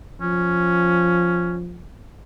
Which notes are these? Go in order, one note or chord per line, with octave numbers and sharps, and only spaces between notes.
F3 C#4